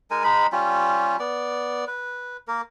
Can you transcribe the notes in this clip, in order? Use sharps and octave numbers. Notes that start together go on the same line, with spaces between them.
G#3 D#4 A#4 G#5
G#3 D#4 B5
G3 C#4 F4 G4
B3 D5
B4
A#3 A#4